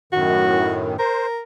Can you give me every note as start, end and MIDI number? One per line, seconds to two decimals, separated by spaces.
0.13 0.97 42
0.13 0.97 45
0.13 0.97 51
0.13 0.86 66
0.99 1.41 70
0.99 1.27 72